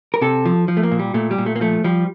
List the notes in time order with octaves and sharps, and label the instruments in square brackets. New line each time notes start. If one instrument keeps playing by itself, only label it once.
[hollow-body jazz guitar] A#4
C3 A4
F3
F3
A3
A#3
A#2
G3
A#2 A3
G3
A#2
A3
A#3
F3 A3
F3 G3